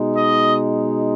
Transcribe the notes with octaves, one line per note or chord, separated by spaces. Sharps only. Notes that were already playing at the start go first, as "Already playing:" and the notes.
Already playing: B2 G#3 D#4
D#5